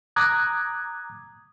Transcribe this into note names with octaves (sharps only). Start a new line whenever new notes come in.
A#5 D6 D#6 F#6 G#6